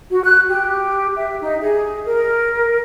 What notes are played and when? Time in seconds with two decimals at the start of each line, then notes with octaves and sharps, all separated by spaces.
0.11 F#4
0.23 F#6
0.48 G4
1.16 E5
1.41 D#4
1.61 G#4
2.05 A#4